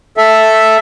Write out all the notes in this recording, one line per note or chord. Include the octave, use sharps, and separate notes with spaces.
A4 E5